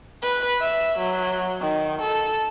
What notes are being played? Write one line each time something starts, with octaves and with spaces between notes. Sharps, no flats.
B4
E5
F#3
D#3
A4